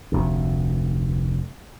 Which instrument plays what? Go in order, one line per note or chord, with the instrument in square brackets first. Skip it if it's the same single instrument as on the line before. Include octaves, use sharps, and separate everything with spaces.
[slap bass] F1 D2